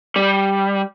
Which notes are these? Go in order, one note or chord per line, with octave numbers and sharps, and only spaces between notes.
G3